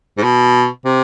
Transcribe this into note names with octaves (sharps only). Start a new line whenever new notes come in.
G#2
B2
C3